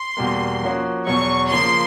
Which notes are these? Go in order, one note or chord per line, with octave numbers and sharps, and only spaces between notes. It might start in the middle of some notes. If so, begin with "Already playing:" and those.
Already playing: C6
E2 B2 G3 A#3
F3 A#3 C#4 F#4
E2 B2 F#3 C#6
C#3 F3 A#3 C6